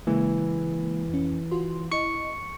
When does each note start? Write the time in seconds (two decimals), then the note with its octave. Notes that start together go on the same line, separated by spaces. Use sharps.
0.07 C#3 E3 G#3 A#3
1.09 F2 C#4
1.51 F4 F#4 C6
1.92 E4 D#5 C#6 C#7